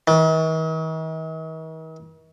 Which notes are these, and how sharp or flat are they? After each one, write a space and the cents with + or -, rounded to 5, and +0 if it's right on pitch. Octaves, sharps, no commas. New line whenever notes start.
D#3 +45